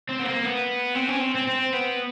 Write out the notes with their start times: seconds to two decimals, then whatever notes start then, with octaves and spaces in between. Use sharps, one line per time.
0.09 C4
0.19 B3
0.26 A#3
0.44 B3
0.95 C4
1.08 C#4
1.21 C4
1.35 C4
1.47 C4
1.73 B3